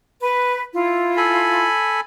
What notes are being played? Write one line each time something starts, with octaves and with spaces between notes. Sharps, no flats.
B4
E4 F4
A4 G#5 B5